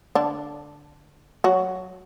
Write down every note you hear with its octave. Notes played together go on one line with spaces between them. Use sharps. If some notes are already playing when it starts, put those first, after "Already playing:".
D3 D4
F#3 F#4